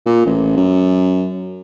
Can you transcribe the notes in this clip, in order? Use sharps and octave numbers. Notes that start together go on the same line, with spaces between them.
A#2
A1
F#2